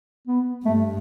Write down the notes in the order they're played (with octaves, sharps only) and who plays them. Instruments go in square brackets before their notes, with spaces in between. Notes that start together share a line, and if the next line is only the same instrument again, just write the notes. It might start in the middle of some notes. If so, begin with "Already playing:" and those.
[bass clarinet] B3
[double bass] G2 [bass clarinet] A3